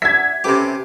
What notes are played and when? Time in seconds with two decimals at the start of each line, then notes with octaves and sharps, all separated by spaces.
0.02 D4 E5 F#5 G#6 B6
0.44 C3 C#4 G4 A4 B4 E5